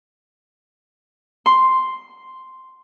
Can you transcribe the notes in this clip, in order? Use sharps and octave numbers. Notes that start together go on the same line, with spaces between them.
C6